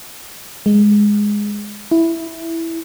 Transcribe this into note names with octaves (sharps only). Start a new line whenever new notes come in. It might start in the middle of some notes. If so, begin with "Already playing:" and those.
G#3
E4